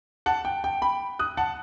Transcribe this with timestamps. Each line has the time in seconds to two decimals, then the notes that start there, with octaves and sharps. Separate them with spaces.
0.26 F#5 A5
0.45 G5
0.64 G5
0.82 G5 B5
1.19 D#6 F#6
1.37 F#5 A5